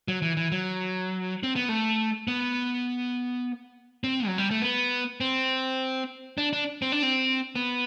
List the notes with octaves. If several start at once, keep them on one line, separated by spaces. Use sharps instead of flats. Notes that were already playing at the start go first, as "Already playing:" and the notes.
F#3
E3
E3
F#3
C4
B3
A3
B3
C4
F#3
G3
A3
B3
C4
D4
D4
C4
D4
C4
B3